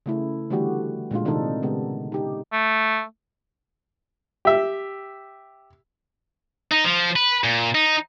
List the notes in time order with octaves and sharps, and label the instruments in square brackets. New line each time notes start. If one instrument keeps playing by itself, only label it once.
[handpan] C#3 A3 E4
D3 E3 G3 A3 F#4 G4
A#2 G#3 D4 F4
C3 D#3 C4 D4 D#4 A4
C#3 G#3 B3 G4
D#4 G4
[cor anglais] A3
[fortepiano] G4 E5
[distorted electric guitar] D#4
F3
B4
A#2
D#4